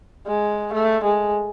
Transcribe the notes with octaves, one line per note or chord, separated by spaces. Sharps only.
G#3
A3
G#3